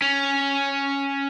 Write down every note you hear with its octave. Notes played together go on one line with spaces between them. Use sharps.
C#4